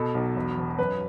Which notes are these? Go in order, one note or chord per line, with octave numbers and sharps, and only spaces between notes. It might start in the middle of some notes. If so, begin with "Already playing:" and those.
Already playing: B2 A4
B1
E1
E1
F#2 B4